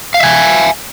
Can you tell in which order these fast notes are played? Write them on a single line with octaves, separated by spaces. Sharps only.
F5 E5 G#5